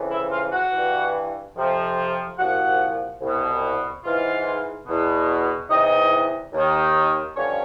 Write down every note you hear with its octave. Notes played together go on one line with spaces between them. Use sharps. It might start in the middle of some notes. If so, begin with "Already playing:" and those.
Already playing: F2 C#3 E3
E4 E5
F4 F5
F#4 F#5
E3
G2
F2 C3 F3
C2 A#2 F3 F#4 F#5
C2 B2
G#2 E3 F4 F5
E2 B2
E2 C3 E3 D#4 D#5
D#2 D#3
G2 D3 F3 C#4 C#5